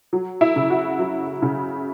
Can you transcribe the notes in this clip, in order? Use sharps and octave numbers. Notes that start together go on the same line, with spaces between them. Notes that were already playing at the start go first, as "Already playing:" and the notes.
F#3
E4
C#3
F#4
F#3
C#3